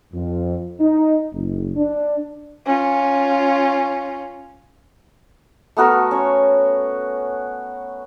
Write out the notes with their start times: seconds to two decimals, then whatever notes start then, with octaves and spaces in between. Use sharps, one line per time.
0.13 F2
0.80 D#4
1.33 F#1
1.77 D4
2.65 C#4 F4
5.77 A3 B3 F#4 A#4
6.11 C#4 C#5